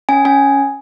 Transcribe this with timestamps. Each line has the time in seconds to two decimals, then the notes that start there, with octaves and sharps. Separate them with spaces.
0.09 C#4 G#5
0.25 C#4 G#5